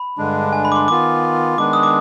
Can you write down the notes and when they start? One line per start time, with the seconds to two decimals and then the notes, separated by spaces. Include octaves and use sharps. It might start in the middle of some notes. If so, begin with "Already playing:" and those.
Already playing: B5
0.18 G2 D3 G#3 D4
0.53 G#5
0.65 B5
0.72 D6
0.76 C6
0.88 D#3 B3 F4 D6
1.58 D#3 G#3 B3 D4 D6
1.73 D#6
1.83 D6